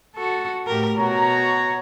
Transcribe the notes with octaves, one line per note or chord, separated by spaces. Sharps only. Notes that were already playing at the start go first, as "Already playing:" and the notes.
F#4 A4
A2 G4 A#4
B2 F#4 C#5 A#5